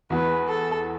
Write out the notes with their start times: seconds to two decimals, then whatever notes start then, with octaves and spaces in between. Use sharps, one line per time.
0.10 E2 E3 B3 B4
0.48 A4